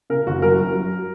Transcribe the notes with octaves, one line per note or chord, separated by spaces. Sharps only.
C#3 A#4
F#1 F#4
F#2 A#4
F#2
F#3